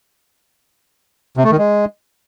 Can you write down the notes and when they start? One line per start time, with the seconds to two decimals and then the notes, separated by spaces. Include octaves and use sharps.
1.37 C3
1.44 A3
1.51 D#3
1.58 G#3